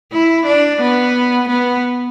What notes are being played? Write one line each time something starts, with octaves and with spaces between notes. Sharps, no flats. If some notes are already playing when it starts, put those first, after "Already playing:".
E4
D4
B3
B3